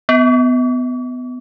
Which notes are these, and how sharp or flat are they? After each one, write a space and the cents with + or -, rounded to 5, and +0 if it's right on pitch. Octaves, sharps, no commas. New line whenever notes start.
B3 +20